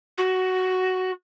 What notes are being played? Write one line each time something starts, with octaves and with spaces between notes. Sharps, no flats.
F#4